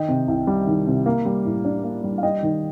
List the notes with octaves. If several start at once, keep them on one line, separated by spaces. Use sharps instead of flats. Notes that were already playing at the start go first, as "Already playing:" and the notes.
Already playing: D#3 D#5 G5
C3
C2
G3
D#3
C3
A#3
G3
A2
D4
A#3
G3
F5
G3 D#5 G5
D#3